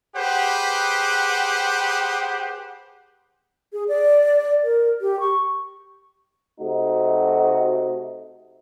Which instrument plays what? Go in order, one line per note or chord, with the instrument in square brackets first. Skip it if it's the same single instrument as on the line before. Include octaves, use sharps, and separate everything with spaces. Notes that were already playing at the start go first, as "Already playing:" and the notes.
[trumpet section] G4 G#4 B4 C5 F#5
[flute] G#4
D5
A#4
G4
C#6
[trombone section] C3 A3 D#4 F#4